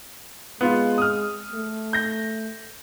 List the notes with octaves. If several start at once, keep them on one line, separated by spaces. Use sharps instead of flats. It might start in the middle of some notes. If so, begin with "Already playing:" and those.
G#3 B3 F4
D#6 F6
A3
G6 A#6